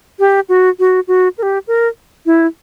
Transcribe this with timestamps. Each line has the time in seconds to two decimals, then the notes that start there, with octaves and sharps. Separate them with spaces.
0.20 G4
0.49 F#4
0.79 F#4
1.08 F#4
1.38 A#4
1.43 G4
1.67 A#4
2.26 E4